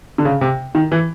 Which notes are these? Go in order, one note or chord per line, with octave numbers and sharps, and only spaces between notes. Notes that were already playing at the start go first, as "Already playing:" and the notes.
D3
C#3
C3
D#3
E3